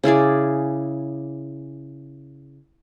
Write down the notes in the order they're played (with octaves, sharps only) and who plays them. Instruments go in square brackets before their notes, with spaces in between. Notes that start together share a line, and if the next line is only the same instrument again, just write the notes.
[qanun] C#3 E4 G#4 D5